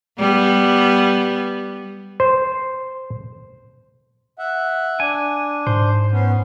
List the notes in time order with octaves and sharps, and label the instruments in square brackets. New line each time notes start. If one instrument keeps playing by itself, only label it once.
[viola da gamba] G3 B3
[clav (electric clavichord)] C5
[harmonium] E5 F#5
[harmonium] D4 [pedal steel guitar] G#5
[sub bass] G#2 [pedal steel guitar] C5
[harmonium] B3 C#4